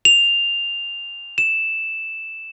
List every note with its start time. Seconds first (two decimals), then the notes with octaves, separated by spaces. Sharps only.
0.05 F7
1.38 E7